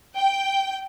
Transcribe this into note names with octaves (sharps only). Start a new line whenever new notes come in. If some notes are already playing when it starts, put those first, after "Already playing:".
G5